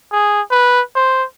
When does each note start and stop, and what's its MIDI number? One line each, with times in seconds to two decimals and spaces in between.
0.12 0.41 68
0.51 0.81 71
0.95 1.24 72